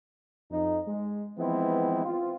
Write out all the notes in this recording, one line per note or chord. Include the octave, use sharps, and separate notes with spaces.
F2 D#4
G#3
E3 F3 G#3 B3 C4 E4
C4 F4